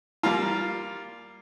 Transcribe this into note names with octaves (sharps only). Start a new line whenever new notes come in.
G3 A#3 F4